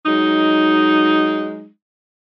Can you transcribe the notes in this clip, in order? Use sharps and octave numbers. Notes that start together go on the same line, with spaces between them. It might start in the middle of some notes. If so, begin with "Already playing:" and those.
F#3 G#3 D#4